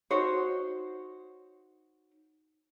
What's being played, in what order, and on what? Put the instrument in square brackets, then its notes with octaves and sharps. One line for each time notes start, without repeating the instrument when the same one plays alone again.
[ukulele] D#4 F#4 C5 C#5